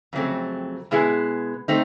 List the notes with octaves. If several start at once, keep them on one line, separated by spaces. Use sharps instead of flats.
F2 C#3 F#3 A3 C4
B2 G#3 B3 E4 G#4
A3 C4 D#4